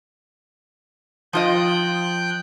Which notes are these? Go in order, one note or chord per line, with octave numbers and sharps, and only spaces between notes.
F3 F4 D#5 G5 F#6 G6